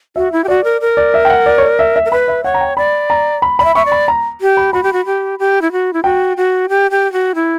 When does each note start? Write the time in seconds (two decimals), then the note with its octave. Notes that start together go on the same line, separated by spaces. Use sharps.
0.16 F#4 E5
0.32 E4
0.44 G4
0.48 F#4 D5
0.64 A#4
0.81 A#4
0.97 D5
1.14 E5
1.25 G5
1.30 F#5
1.46 D5
1.58 C#5
1.63 D5
1.79 E5
1.96 E5
2.05 A#4
2.11 B4 B5
2.28 E5
2.44 C#5 F#5
2.54 A#5
2.61 G5
2.77 D5 B5
3.10 A#5
3.42 B5
3.59 D5 B5
3.64 E5
3.75 E5 C#6
3.86 D5
3.92 B5
4.08 A#5
4.41 G4
4.57 B5
4.73 F#4 B5
4.83 G4
4.93 F#4
5.06 G4
5.39 G4
5.62 E4
5.72 F#4
5.93 E4
6.04 F#4 G5
6.37 F#4
6.69 G4
6.91 G4
7.13 F#4
7.35 E4